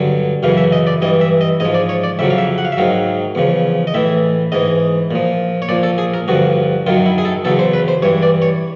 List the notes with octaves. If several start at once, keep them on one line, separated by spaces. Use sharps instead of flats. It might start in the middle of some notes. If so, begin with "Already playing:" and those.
Already playing: G2 D3 F#3
F#2 C#3 E3 F5
E5
D#5
D5
G2 E3 D#5
E5
D#5
G#2 F3 D#5
D5
C#5
D5
F2 C#3 F#3 E5
F5
E5
F#5
F5
E5
G#2 D#3 F#3 F5
E2 C#3 F3
D#5
A2 E3 E5
G#2 E3 D#5
A#2 F3
C#5
A#2 F3 D5
A4
G#4
A#4
G2 D3 F3 F#4
F#2 D#3 F#3 F4
E4
G#4
A4
E2 C#3 F#3 A4
C5
B4
C5
G2 E3 C#5
D5
C#5